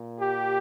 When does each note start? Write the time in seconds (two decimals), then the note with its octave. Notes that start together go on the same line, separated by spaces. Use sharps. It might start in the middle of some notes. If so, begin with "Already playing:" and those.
Already playing: A#2
0.19 G4